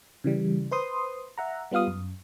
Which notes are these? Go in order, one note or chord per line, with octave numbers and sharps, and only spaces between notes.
C#3 E3 G3
B4 C5 C6 D#6
E5 F#5 A#5
G3 B3 F4 F5 D#6
F#2